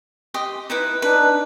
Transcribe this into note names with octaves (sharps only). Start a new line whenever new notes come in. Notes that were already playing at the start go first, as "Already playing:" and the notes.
G4 D#5 C6
D#4 E4 B4
D4 D#4 B4